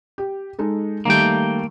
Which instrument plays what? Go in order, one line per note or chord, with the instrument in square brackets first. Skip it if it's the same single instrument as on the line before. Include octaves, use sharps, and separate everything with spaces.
[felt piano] G4
G#3 D#4 A4
[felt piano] D#3 G3 A3 [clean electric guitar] A#3 G5